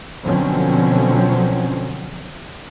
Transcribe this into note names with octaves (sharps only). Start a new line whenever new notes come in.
B2 D3 F3 F#3 C4 C#4